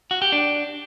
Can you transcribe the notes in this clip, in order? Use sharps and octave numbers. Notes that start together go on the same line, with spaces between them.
F#4
G4
D4